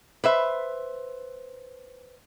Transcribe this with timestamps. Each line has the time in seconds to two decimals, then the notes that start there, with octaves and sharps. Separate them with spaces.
0.24 B4 C5 E5